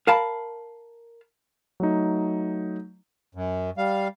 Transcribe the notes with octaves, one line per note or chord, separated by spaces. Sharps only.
A#4 F5 A5 B5
F#3 A3 D#4
F#2
G3 F5